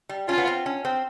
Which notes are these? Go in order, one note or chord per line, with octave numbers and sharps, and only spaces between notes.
G3
C#4 F4
B3
C4
C#4
C4